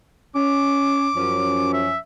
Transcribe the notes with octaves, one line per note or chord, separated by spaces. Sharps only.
C#4 D6
F#2 F3 C#4
E5